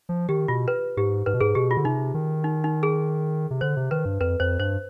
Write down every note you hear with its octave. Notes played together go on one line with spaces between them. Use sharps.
F3
D#3 G4
B2 F4
B4
G#2 G4
G#2 B4
B2
G#2 G#4
B2 G4
F4
D3
C3 D#4
D#3
D#4
D#4
G#4
C3
D3 C5
C3
D#3 B4
G2
F2 B4
F2 C5
G2 C5